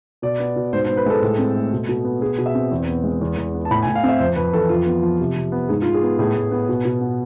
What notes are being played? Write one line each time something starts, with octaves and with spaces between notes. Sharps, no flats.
B2 D5
B3
B2
G#2 C5
C5
B3
B4
G#3 A4
A2
C4
A3
B2
B2
B3
B2 G#4
B2
E5
C4
E2
B3
G#3
E2
E2
B3
A5
A2 B5
G#5
A2
F5
C4 E5
F2 C5
F2 B4
E3 A4
F2 F4
B3
F3
C3
C3
B3
G#2 G#4
F4
G#2
G#4
B3
A2 G#4
A2
B3
B2
B2
B3